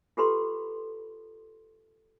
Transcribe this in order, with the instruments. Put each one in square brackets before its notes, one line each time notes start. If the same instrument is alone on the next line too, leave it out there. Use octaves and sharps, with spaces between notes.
[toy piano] F4 G4 A4 B4 A#5 C6